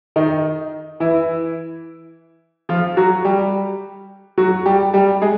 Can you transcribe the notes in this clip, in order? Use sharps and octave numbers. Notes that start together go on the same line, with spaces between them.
D#3 D#4
E3 E4
F3 F4
F#3 F#4
G3 G4
F#3 F#4
G3 G4
G3 G4
G#3 G#4